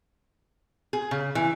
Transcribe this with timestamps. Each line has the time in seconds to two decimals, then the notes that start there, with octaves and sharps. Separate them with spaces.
0.93 G#4
1.11 C#3
1.35 E3